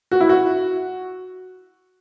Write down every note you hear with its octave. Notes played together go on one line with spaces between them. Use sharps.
F#4
E4
F#4